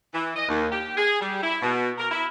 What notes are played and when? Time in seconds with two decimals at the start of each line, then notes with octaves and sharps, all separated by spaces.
0.13 E3
0.36 D#5
0.49 D#2
0.71 G4
0.97 G#4
1.20 G3
1.42 E4
1.62 B2
1.98 A#4
2.11 E4